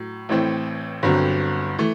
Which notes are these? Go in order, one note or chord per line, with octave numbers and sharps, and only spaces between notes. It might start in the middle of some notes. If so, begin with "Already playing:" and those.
Already playing: A2 F#3
A1 A2 E3 A3 C4
G1 G2 D3 F#3 C4
E3 A3